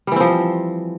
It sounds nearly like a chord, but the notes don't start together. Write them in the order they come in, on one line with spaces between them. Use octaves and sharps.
G3 E3 C4 F3